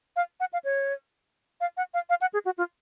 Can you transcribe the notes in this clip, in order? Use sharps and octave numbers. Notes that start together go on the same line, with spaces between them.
F5
F#5
F5
C#5
F5
F#5
F5
F5
F#5
G#4
F#4
F4